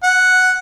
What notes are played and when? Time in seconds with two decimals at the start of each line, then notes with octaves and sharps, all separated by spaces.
0.03 F#5